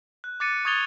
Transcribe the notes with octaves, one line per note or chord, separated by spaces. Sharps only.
F#6
D6 F#6 A6 C#7 D#7
C#6 D#6 G#6 A6 F7 G7